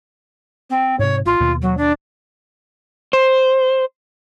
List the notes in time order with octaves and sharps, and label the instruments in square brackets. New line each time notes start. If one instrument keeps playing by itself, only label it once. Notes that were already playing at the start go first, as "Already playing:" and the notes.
[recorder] C4
[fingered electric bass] G#2 C3 [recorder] C#5
[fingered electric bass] A1 [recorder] F4
[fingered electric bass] D#2 B2
[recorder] F#3
D4
[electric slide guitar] C5